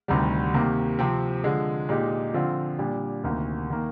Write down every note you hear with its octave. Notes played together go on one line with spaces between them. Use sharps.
D2 C3 D#3 G3
C3 D#3 A#3
C3 F3 C4
D3 F3 G#3
A#2 G#3 D#4 G4
D3 F3 C4 F4
A#2 G3 D4 G4
D2 C3 D#3 A#3
D#3 A#3